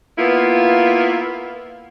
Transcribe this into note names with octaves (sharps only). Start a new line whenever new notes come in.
A#3 B3 E4 F4